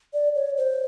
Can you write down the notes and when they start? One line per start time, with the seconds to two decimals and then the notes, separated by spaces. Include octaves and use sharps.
0.14 D5
0.35 C#5
0.57 C5